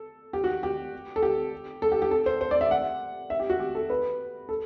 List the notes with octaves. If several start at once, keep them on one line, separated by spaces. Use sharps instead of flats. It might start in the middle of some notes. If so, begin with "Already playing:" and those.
Already playing: A4
G4
F#4
G4
A4
G4
A4
G4
G4
A4
C5
C5
D5
E5
F#5
E5
G4
F#4
G4
A4
B4
A4